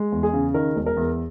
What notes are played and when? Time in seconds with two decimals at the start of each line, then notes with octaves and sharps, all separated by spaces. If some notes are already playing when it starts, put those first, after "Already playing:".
Already playing: G#3
0.12 E2
0.23 G#4
0.33 C#3
0.54 D#3 A#4
0.76 E1
0.86 A#4
0.97 E2